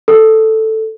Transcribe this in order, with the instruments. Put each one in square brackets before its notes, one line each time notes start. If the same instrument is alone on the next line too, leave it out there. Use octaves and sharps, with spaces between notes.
[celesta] A4